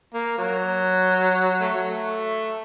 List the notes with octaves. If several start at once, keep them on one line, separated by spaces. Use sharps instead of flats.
A#3
F#3
A3
F#3
A3